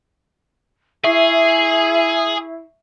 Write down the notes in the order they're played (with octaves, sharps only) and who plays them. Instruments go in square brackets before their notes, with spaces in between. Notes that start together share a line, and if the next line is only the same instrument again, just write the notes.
[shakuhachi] E4 [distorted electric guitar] G#4 [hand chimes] E5 C#6 C7